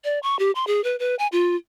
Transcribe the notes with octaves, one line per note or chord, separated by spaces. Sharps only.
D5
C#6
G4
C6
G#4
B4
B4
G#5
F4